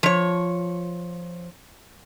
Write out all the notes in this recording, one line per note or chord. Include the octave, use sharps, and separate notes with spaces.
F3 C#5